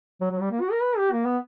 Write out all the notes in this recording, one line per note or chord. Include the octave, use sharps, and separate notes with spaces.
F#3
F#3
G3
A#3
F#4
A#4
B4
G4
A#3
B3